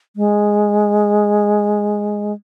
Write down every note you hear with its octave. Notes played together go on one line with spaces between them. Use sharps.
G#3